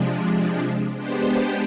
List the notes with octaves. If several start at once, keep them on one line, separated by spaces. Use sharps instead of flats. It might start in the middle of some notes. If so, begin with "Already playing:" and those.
Already playing: C3 F3 G#3 D4
G#3 B3 D4 G4 C5